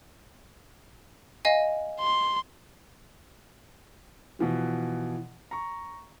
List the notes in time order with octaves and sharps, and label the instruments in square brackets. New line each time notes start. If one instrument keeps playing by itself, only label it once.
[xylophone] D#5 F5 G#5
[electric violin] C6
[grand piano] B2 E3 F3
A#5 C#6